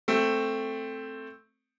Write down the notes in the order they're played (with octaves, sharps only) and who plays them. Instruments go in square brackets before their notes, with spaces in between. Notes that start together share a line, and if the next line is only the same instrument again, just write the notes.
[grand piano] A3 C4